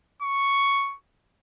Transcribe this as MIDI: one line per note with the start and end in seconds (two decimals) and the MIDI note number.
0.22 0.96 85